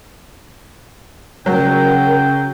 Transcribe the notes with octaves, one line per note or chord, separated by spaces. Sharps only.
C#3 F#3 A#4 G5